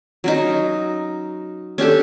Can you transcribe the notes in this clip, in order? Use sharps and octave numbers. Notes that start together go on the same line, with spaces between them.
F#3 C#4 D#4
C#4 D4 G4 A4